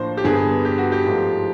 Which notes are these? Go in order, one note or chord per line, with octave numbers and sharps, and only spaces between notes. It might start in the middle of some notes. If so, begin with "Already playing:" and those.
Already playing: A2 F3 A#3 D4 C5
G4
G2 D3 G3 B3 G#4
G4
F#4
G4
G#2 F3 A3